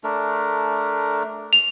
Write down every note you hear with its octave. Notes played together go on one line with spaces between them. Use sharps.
A3 D4 A#4
F7